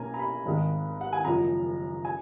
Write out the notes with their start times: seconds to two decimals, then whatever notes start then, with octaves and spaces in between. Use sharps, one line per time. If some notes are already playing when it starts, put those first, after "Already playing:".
Already playing: B1 B2 A#3 C#4 G#5 A#5
0.14 A#5
0.19 B5
0.46 G#1 G#2 D#3 G#3
1.01 F#5
1.13 G#5
1.25 F#1 F#2 F3 G#3 A#5
2.05 G#5